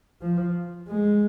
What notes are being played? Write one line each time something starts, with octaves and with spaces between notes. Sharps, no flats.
F3
G#3